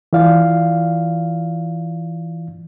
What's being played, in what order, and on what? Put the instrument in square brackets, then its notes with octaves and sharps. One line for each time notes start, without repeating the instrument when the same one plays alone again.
[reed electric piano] E3 F4 D5 F5